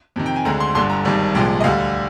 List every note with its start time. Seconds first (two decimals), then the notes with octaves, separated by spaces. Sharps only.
0.16 F2 C3 D#3
0.26 G5
0.36 G#5
0.45 D2 D3 G#3 A#5
0.60 C6
0.75 G1 G2 D3 C6
0.90 A#5
1.05 G#1 G2 D#3 G3
1.35 C2 A#2 F3 G#3 G5
1.61 D#5
1.64 D2 D3 G3 F5